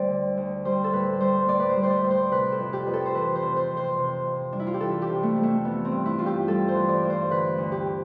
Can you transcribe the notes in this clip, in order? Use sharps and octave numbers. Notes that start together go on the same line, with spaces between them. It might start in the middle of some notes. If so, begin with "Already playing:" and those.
Already playing: D2 G3 C5 D5
D3
D2
G3 C5
A4
A2 B4
G3 C5
A2 D5
B4
C5
G3
C5
D5
A2
C5
C3 B4
A4
F2
G4
F2 B4
A4
C5
E3 B4
C5
C3
C5
F2
C5
C3
F2
G3 D4
E4
F4
G4
E3 A4
G4
C3
A3
F2
A3
E3 B3
C4
G2
E4
G2 F4
G4
G3 A4
C5
E3
D5
G2
C5
D3 B4
D2
G4